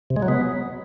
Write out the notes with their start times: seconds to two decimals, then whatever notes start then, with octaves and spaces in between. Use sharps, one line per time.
0.10 C3
0.16 G#3
0.22 F#3
0.28 B3